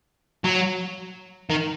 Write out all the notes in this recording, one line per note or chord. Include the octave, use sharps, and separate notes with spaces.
F#3
D#3